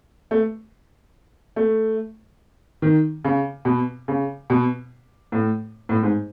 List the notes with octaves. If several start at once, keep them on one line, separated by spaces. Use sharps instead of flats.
A3
A3
D#3
C#3
B2
C#3
B2
A2
A2
G#2